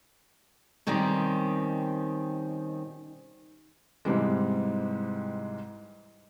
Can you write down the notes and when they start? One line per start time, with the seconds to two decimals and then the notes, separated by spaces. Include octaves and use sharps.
0.87 B2 D#3 G3 C4 C#4 G4
4.05 G#2 C3 E3 G3 G#3